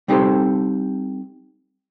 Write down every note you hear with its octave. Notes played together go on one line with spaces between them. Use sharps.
G3 C4 D#4 G4 A4 C5